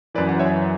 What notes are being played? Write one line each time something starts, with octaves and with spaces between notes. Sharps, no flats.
F#2 E3 B4 D5
F#5
C#5 E5